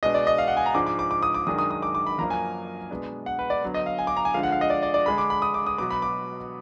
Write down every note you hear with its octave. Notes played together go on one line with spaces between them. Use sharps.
B2 G#3 D4 D#5
D5
D#5
F5
F#5
G#5
A#5
G#2 F3 G#3 D4 D6
D6
D6
D6
D#6
D6
F#2 D#3 G#3 D4 D#6
D#6
D#6
D6
D6
B5
F#2 F3 A#3 D4 A#5
G#5
B2 G#3 B3 D4
F#5
B4
D5
D3 F#3 B3
D#5
F5
G#5
D6
A#5
G#5
D3 F3 G#3 F5
F#5
F5
D#5
D5
D5
D5
D3 G#3 D4 B5
D6
B5
D#6
D6
D#6
B2 F#3 B3 D6
B5
D6